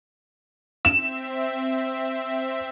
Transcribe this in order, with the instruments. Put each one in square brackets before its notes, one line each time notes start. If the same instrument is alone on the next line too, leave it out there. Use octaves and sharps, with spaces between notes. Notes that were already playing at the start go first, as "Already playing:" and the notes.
[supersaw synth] C4 E5 [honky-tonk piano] E7